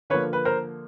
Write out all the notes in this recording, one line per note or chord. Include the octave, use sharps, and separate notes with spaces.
D3 F3 A#3 B4 C#5
B4
A#4 C5